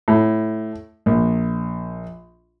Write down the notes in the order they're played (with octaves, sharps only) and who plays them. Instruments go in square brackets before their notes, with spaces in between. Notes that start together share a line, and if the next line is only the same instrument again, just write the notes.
[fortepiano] A2
A#1